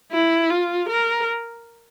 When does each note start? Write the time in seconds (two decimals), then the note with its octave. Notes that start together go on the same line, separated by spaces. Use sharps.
0.12 E4
0.50 F4
0.89 A#4